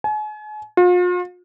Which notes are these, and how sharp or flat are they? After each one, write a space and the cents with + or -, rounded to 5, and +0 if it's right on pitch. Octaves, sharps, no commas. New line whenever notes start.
G#5 +40
F4 +40